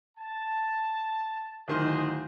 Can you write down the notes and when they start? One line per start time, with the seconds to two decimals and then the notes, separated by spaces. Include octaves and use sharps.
0.17 A5
1.68 D1 D#3 G#4 C5 D#5 C6